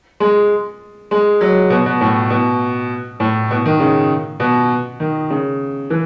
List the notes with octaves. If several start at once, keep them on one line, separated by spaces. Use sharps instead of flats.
G#3
G#3
F#3
B2
B2
A2
B2
A2
B2
D#3
C#3
B2
D#3
C#3
E3